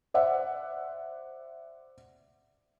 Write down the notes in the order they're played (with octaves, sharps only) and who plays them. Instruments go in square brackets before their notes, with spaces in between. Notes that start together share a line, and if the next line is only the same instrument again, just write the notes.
[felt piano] C5 D5 E5 F#5